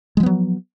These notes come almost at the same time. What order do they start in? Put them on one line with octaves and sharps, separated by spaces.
G#3 F3 B3 F#3